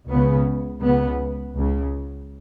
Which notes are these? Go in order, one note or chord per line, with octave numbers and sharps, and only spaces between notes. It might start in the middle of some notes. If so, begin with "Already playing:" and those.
C#2 C#3 B3
C#2 C#3 B3
C#2 C#3